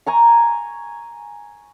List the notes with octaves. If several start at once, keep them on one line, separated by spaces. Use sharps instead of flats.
G#5 A#5 C#6